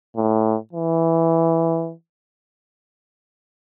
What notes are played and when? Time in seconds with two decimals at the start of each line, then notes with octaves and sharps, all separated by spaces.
0.16 A2
0.73 E3